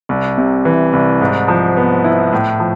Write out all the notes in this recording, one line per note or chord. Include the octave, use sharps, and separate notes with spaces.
C2
C3
E3
C2
G#2
F3
B3
E4
A2
F3